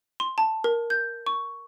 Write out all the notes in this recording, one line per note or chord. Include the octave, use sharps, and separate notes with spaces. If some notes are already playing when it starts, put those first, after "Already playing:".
C6
A5
A#4
G6
C#6